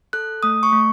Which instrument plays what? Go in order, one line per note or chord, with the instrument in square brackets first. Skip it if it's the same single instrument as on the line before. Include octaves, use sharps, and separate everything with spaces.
[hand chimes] A4 F#6
A3 D#6
C#6
A3